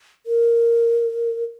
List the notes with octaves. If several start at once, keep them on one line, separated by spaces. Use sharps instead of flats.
A#4